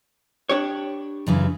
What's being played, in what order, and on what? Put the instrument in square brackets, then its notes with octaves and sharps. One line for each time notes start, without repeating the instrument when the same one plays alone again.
[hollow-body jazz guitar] D4 G4 C#5
[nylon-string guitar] F#2 C#3 E3